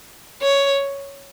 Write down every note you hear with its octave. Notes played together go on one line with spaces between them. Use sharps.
C#5